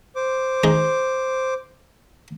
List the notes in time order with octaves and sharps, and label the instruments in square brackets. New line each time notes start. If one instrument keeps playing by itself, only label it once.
[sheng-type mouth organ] C5 D6
[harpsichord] D#4 G#4